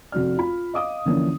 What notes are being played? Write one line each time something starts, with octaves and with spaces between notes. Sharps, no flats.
F1 F2 F#4 D5 F6
F4 B5
D#5 F5 D6 D#6
D3 E3 F3 A#3 C#4 D4